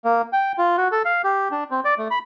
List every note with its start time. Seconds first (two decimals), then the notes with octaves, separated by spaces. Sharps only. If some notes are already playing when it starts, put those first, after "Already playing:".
0.05 A#3
0.33 G5
0.58 F4
0.77 F#4
0.92 A4
1.05 F5
1.24 G4
1.51 D4
1.71 C4
1.85 D5
1.98 A3
2.11 B5